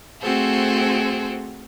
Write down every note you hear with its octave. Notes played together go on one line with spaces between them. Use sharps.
A3 C4 F#4 G#4 A4 C5